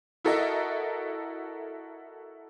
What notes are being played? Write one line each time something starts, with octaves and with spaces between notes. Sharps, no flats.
E4 F#4 A4 A#4 D#5 E5